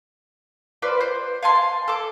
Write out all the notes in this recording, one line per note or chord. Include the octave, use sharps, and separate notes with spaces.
F4 B4 C5 D5
C5
F5 G#5 A5 C6
A4 D6